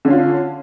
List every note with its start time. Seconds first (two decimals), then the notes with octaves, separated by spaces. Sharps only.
0.05 D3
0.08 C#4
0.10 F4